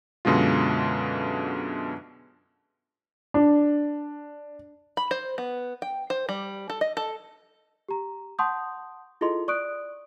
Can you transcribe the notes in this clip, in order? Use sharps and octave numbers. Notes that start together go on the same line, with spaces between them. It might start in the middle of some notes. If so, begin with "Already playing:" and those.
F#2 B2 D3 G#3 F4
D4
B5
C5
B3
G5
C5
G3
A4
D#5
A4
G4 A#5
F#5 A5 C6 C#6 D#6 G6
E4 F4 G#4 A4 D#5 C6
D5 C#6 D#6 F#6 D7